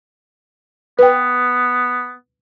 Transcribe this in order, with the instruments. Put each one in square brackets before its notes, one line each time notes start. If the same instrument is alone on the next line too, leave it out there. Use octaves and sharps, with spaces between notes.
[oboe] B3 [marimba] B4 G5